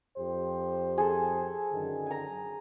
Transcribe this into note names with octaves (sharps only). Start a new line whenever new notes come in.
F2 G4 C5
G#4 A4
F#2 D3 D#3
G#5 A#5